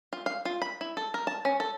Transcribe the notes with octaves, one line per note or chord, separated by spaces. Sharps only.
F4
F5
F4
B5
E4
A4
A#4
A5
C#4
A4